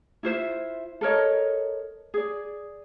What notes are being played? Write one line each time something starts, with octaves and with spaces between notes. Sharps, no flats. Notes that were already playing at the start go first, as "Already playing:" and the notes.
E4 F4 C5 E5
A4 A#4 C#5 D#5
G#4 D5